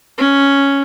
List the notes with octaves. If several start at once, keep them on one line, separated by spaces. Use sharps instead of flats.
C#4